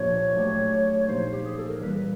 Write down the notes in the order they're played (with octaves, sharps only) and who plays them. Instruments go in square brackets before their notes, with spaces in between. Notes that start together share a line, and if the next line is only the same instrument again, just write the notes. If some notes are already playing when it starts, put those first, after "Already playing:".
Already playing: [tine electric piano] A#2 F3 A#3 D4 G4 [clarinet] C#5
[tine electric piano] F#3 A3 D4 G4
[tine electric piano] A#2 F3 A#3 D#4 [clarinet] C5
[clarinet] G4
G#4
A4
A#4
[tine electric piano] E3 G3 A#3 [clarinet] B4